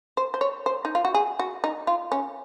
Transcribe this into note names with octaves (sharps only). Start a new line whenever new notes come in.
C5
C5
C#5
C5
D#4
F4
F#4
G#4
F#4
D#4
F4
C#4